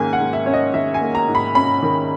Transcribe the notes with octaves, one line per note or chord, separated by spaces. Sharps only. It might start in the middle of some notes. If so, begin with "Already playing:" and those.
Already playing: G#2 D#3 A#3 C#4 G#5
F#5
G#2
E5
C#4 C#5
D#5
D#3 E5
G#5
A#3
A#5
G#2
B5
C#4 B5
D#3